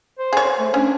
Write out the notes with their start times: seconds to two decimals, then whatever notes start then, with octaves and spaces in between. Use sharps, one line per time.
0.19 C5
0.33 G#4 C#5
0.59 A3
0.74 C#4 D4